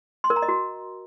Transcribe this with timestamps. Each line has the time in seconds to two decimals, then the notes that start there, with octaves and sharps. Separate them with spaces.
0.24 C6
0.30 A#4
0.36 A#5
0.42 D#5
0.48 F#4